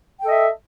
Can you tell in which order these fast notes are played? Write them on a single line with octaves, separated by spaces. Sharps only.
G5 A4 D#5 E5